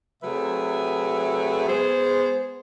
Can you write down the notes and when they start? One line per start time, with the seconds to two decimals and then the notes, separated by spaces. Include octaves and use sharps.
0.23 C3 F#3 A3 G#4 B4 E5
1.68 G#3 B3 G#4 C5